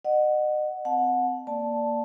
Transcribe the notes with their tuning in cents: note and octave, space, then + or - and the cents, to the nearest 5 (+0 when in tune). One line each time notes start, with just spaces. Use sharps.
D#5 -35 F#5 +0
C4 -25 F#5 -25 A5 -15
A#3 +0 D5 +0 A5 +0